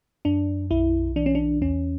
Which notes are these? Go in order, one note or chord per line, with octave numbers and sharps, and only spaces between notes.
F#2 D4
B1 E4
E3 D4
C#4
D4
E2 C#4